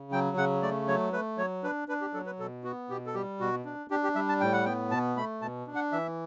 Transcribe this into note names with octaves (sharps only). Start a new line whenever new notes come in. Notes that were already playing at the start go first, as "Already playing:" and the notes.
Already playing: C#3
F#3 G5
C#3 F#5
A3 D5
F#3 C#5
A3 B4
F#3 C#5
D4 B4
D4 B4
G4
F#3 A4
B4
B2 A4
B3 F#4
B2 G4
A4
G3 G4
B2 F#4
D4
D4 G4
G4
G3 E5
A5
A2 G5
F#5
B3 G5
B2 A5
A3 B5
B2 A5
D4
F#5
E3 E5